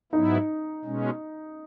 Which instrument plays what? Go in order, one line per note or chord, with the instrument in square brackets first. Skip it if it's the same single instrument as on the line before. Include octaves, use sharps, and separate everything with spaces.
[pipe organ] G#2 F#3 B3 E4 [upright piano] D#4
[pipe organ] B2 G#3 C#4